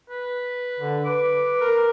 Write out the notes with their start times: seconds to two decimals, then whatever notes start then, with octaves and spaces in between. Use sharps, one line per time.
0.10 B4
0.80 D3
1.05 B4 D6
1.61 A#4